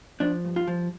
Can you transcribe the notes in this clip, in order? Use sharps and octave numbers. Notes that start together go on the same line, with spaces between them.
F3 D4
G2
F4
F3